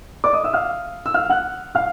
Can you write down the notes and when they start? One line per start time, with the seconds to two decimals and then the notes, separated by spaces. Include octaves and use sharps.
0.24 D5 D6
0.33 D#5 D#6
0.44 E5 E6
0.53 F5 F6
1.06 E6
1.14 F5 F6
1.30 F#5 F#6
1.75 F5 F6